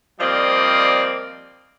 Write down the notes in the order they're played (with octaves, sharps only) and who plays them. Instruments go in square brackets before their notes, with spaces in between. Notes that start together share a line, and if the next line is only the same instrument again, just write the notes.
[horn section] F3 G3 A#3 C4 D5 D#5